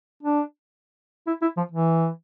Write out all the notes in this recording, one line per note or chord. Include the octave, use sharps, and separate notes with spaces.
D4
E4
E4
F3
E3